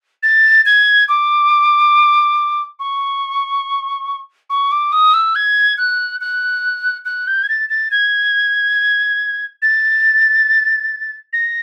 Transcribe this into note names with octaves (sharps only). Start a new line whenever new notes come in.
A6
G#6
D6
C#6
C#6
D6
D#6
E6
G#6
F#6
F#6
F#6
G6
G#6
A6
A6
G#6
A6
A#6